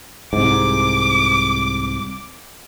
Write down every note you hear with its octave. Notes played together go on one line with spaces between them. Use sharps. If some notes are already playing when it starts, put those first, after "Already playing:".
C2 G#2 D6